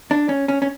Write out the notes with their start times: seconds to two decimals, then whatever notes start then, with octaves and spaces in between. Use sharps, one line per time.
0.11 D4
0.29 C#4
0.48 C#4
0.62 C#4